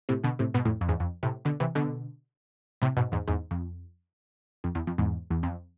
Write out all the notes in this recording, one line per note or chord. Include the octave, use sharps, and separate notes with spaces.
A2 C3
B2 D3
A2 C3
G#2 B2
F2 A2
F2
E2 G#2
F2
A2 C3
B2 D3
C3 E3
B2 D3
A2 C3
G#2 B2
E2 G#2
E2 G#2
F2
F2
E2
F2
E2 G#2
E2
F2